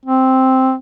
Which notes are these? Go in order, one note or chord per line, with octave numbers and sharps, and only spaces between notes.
C4